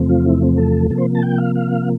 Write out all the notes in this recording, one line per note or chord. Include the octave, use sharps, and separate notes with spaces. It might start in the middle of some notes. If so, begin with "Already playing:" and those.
Already playing: E2 C3 F3 A3 C4
F4
E4
C4
A4
C3 F3 A#3 A4
C5
A5
G5
F5
F5